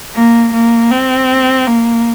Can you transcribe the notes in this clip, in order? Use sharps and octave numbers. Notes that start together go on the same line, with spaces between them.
A#3
A#3
C4
A#3